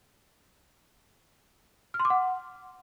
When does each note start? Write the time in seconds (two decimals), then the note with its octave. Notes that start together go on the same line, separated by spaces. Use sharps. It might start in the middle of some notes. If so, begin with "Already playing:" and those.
1.94 F6
2.00 C6
2.05 D6
2.10 F#5